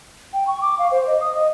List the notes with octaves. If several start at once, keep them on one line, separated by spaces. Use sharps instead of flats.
G5
C#6
D6
F5
C5
D#5
D#6
D#5